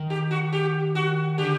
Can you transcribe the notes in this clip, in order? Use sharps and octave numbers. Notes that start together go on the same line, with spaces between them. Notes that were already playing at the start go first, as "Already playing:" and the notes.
Already playing: D#3
G4
F#4
G4
F#4
D3 G4